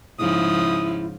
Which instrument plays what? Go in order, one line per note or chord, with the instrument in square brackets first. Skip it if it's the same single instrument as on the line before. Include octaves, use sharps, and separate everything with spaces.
[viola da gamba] G#2 C#3 F3 [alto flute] E4 [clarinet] D#6